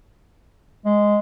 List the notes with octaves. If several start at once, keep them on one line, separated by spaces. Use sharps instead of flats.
G#3